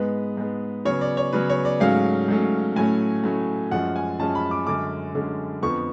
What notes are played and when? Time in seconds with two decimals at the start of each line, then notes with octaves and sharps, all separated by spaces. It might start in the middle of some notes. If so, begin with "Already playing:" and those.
Already playing: G#2 G#3 B3 B4
0.37 G#2 G#3 B3
0.85 C#3 F#3 B3 C#5
1.01 D5
1.17 C#5
1.33 C#3 F#3 B3 B4
1.50 C#5
1.65 D5
1.80 G#2 F#3 A3 C#4 F5
2.28 G#2 F#3 A3 C#4
2.76 A2 F#3 A3 C#4 G#5
3.24 A2 F#3 A3 C#4
3.71 F#2 F3 G#3 C#4 F#5
3.96 G#5
4.19 F#2 F3 G#3 C#4 A5
4.35 B5
4.51 D6
4.67 F#2 D3 G#3 C#4 D6
5.15 F#2 D3 G#3 C#4
5.62 F2 D3 F3 B3 C#6